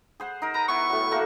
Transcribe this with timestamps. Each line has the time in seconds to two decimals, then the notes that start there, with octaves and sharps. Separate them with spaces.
0.20 G#4 C5 F#5
0.42 D#4 A#4
0.54 B4 A#5
0.68 B3 E4 C#6
0.90 A2 F#3
1.11 A3 A#3 F#4